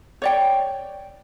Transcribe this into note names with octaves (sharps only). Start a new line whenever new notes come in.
C#5 D5 G5